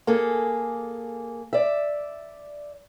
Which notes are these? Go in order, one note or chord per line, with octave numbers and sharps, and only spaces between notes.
A#3 G#4 A4
D5 E5